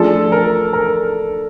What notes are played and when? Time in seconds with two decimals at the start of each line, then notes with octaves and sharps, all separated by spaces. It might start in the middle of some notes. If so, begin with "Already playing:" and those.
Already playing: F3 A3 D4 F4 G#4 A4
0.32 A#4
0.73 A#4